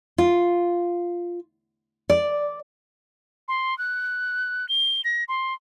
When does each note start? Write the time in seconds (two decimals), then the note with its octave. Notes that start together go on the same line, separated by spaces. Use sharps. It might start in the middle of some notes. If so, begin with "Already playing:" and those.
0.18 F4
2.10 D5
3.48 C6
3.78 F#6
4.69 G7
5.04 A#6
5.28 C6